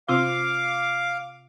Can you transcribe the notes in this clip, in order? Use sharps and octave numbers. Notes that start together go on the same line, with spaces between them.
C3 C4 F4 F5 D6